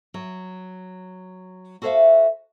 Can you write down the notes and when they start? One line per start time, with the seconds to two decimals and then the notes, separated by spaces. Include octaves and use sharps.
0.14 F#3
1.82 F#4 A4 C5 C#5 E5 F5